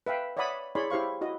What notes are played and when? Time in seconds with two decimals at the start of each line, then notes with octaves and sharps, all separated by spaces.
0.07 B4 E5 F5 G5
0.37 C#5 D5 E5 F#5 B5 D#6
0.75 E4 G#4 C#5 D5 B5 C6
0.90 E4 G4 C5 F5 C#6
1.21 E4 F#4 D#5